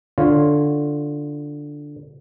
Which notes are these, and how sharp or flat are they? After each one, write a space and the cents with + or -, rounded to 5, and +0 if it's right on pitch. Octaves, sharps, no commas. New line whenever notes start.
D3 +0 F4 +0 C#5 -15